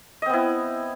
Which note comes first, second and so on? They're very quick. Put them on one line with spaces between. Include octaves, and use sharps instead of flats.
D#5 C4 B3 E4